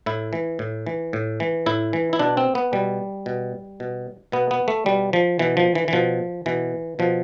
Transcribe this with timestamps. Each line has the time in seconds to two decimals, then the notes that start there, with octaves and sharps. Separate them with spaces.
0.06 A2 E4
0.33 E3
0.59 A2
0.86 E3
1.13 A2
1.40 E3
1.66 A2 E4
1.93 E3
2.13 E4
2.19 B2 D4
2.37 C4
2.55 B3
2.73 B2 G3
3.26 B2
3.80 B2
4.32 B2 B3
4.51 B3
4.68 A3
4.86 B2 G3
5.13 F3
5.39 B2 E3
5.57 F3
5.75 E3
5.88 E3
5.93 B2 F3
6.46 B2 E3
6.99 B2 F3